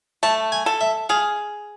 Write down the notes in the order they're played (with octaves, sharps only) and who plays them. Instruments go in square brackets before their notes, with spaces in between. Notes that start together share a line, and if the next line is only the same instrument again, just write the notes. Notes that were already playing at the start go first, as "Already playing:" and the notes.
[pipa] A3 [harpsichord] A5
[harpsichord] G#5
[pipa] A4
[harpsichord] E5
[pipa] G#4 [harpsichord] F5